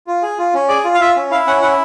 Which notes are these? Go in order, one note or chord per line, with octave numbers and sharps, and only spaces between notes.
F4
G#4
F4
C#4
G#4 D5
F4
F5
F4 E5
C#4
E4 F5
C#4 F#5
E4 F#5